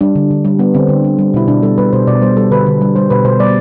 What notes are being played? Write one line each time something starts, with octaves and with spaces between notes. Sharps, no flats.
G3 D4
D3
D3
G3
G3 B3
D3 C4
D3
G3
G3
B2 E4
B2 D4
G3 A4
G3 B4
B2 C5
B2 D5
G3 C5
G3 A4
D3 B4
D3
G3
G3 C5
B2 B4
B2 C5
G3 D5